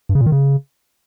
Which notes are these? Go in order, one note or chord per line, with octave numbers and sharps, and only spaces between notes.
G2
C#3
A#2
D#3
C#3